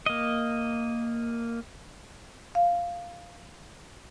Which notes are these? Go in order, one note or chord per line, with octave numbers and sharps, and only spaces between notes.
A#3 D#5
F5